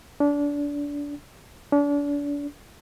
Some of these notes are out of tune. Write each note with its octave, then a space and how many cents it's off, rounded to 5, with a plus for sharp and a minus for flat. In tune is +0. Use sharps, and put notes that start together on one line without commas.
D4 -25
D4 -35